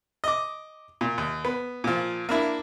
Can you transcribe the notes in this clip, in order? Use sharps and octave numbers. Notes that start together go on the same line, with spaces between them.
D#5 D6
A#2
D#2
B3
A#2 F3
A#3 D4 E4